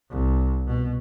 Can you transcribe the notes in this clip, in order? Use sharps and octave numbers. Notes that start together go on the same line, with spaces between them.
C2
B2